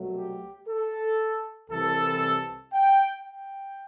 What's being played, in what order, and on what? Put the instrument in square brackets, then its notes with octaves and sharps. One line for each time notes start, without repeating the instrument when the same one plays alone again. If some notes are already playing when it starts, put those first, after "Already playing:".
Already playing: [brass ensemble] C2 B2 F#3 A3
G4
A4
C2 C3 E3 A4
G5
G5